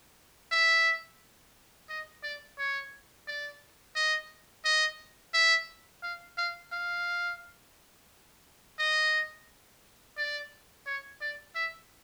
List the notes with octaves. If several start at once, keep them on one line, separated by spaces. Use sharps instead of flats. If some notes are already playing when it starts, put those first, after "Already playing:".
E5
D#5
D5
C#5
D5
D#5
D#5
E5
F5
F5
F5
D#5
D5
C#5
D5
E5